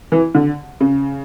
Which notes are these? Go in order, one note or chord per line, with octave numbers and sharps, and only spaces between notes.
E3
D3
C#3